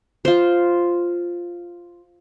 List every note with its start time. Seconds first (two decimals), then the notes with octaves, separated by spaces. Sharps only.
0.25 F4 C5